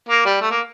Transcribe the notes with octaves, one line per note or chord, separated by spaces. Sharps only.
A#3
G3
A3
A#3